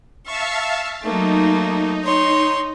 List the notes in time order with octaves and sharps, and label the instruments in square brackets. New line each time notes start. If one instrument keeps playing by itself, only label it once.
[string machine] E5 F5 A5 [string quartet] C#6
[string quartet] F#3 A3 A#3 [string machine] D#4
[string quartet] C#5 C6